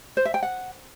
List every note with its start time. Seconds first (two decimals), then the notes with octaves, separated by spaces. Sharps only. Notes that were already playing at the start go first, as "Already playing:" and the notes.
0.17 C5
0.25 E5
0.34 G5
0.43 F#5